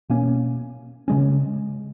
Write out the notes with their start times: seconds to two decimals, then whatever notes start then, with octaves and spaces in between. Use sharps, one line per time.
0.09 B2 A#3 C#4
1.08 C#3 G#3 C#4